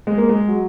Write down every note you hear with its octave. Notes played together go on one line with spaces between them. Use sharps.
G#3
A#3
G#3
F#3